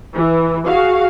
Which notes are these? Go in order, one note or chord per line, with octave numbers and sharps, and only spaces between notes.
E3
F#4 G#4 F5